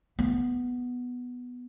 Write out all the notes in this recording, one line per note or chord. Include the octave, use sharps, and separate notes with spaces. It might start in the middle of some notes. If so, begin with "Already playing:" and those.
B3